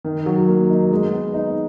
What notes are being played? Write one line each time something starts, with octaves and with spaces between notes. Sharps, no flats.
D#3
F#3
A#3
D#4
G#3
B3
D#4